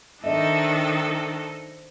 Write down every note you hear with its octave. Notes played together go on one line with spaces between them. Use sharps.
D#3 D4 D#4 A4 C5 D#5 E5